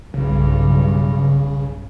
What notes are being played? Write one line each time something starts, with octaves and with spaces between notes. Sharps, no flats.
B1 G2 C#3